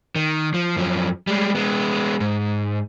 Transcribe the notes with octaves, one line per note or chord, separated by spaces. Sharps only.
D#3
F3
F#2 F3
G3 G#3
G#3 B3
G#2